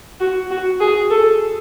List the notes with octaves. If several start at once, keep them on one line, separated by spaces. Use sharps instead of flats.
F#4
F#4
G#4
A4